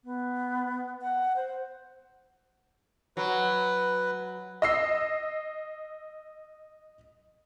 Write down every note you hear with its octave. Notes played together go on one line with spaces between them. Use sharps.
B3
F#5
C5
F#3 B4
D#5 E6 C7